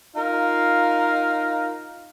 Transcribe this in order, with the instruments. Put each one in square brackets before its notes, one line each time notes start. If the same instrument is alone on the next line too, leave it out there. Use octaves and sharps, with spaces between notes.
[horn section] D#4 F4 A#4 F5